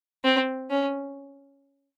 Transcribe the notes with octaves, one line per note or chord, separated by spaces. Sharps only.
C4
C#4